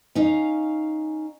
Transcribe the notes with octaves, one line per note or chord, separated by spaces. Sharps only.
C#4 D#4 F5